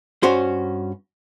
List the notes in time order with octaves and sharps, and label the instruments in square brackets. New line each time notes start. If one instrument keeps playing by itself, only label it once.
[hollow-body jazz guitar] G2 C#4 F#4 C5 C6